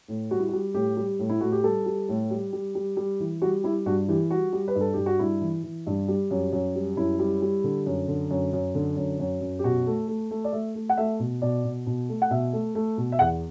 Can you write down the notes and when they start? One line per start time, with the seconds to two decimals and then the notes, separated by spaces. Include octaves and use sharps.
0.08 A2
0.31 G3 F#4
0.39 E4
0.49 F#4
0.53 G3
0.74 A2 G4
0.97 G3
1.19 A2
1.30 E4
1.41 A2 F#4
1.52 G4
1.64 G3 A4
1.86 G3
2.09 A2
2.31 G3
2.53 G3
2.75 G3
2.97 G3
3.20 E3
3.42 G3 F#4
3.64 G3 E4
3.86 G2 F#4
4.08 E3 G4
4.31 G3 F#4
4.53 G3
4.68 B4
4.75 G2
4.81 A4
4.93 G2 G4
5.06 F#4
5.19 G2 E4
5.41 E3
5.64 E3
5.87 G2
6.08 G3
6.31 F#2
6.53 F#2
6.76 G3
6.97 F#2 E4
7.19 G3
7.42 G3
7.64 D3
7.86 F#2
8.08 D3
8.31 F#2
8.53 F#2
8.75 D3
8.97 F#2
9.20 F#2
9.41 F#2
9.59 G4
9.64 B2 F#4
9.87 A3
10.08 A3
10.31 A3
10.44 D5
10.53 A3 E5
10.75 A3
10.89 F#5
10.97 A3 E5
11.20 B2
11.42 B2 D5
11.64 B2
11.86 B2
12.09 A3
12.22 F#5
12.31 B2 E5
12.53 A3
12.75 A3
12.97 B2
13.12 E5
13.19 E2 F#5